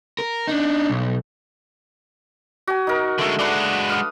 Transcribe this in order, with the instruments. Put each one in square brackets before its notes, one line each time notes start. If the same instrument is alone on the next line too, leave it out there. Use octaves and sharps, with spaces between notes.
[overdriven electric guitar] A#4
D4 D#4
B1
[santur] F#4 G#5
D#4 A#4
[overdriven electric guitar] D3 G#3 [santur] A3 A4
[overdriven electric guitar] G#3 F#4 [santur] D4 B4
[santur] F5 D#6